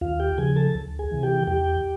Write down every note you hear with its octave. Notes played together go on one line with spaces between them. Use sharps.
D#2 F4 F5
G4 G5
C#3 F3 G#4 G#5
A4 A5
D2
G#4 G#5
C3 E3
G4 G5
E2 G4 G5